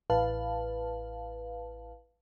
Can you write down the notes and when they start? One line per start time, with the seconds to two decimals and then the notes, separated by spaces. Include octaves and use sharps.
0.10 A1 B4 F5 A5